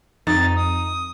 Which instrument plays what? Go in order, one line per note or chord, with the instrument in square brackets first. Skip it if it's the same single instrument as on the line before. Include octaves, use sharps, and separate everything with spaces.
[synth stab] F2 [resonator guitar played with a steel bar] D#4 [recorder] A6
[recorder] D#6